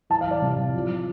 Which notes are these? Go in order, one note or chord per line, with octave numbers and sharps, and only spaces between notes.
E3 A5
F5
E3 D5
C3
C3
F3
F3